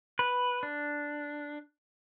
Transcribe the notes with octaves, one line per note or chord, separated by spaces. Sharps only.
B4
D4